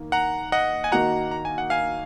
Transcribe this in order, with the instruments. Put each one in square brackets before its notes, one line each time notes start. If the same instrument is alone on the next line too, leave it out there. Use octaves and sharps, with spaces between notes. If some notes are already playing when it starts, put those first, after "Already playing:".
Already playing: [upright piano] D#3 A#3
[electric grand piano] F#5 A#5
D#5 F#5
G#5
[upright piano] D#3 A#3 D#4 F#4 [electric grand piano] F#5 A#5
[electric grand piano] A#5
G#5
F#5
F5 G#5